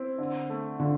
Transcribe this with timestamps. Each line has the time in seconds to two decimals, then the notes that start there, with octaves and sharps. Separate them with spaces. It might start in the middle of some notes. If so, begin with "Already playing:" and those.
Already playing: C4 E4
0.18 D3
0.49 A3
0.80 D3 F4